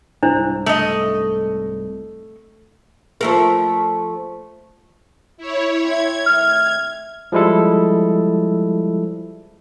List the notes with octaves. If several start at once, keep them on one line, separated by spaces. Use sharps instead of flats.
C2 G#2 D4 E4 C5
A3 D#5
F3 A3 A#4
E4 C#5
C4 E4 G#6
A2 D#3 F6
F3 G3 G#3 E4 A4